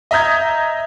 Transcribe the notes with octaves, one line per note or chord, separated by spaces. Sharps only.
D#5 E5 A#5 D#6 G6 G#6